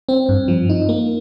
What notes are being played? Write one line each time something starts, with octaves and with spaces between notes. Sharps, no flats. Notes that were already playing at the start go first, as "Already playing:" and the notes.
C4
G2
F3
D#4
A#3